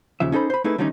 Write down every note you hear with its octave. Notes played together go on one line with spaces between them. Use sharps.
D#2 C#3 F3 E5
C#4 D#4 A4 C5 B5
C5 B5
A3 D#4 E4 G#4 B4
D3 D#3 G3 A3 C#4 D#4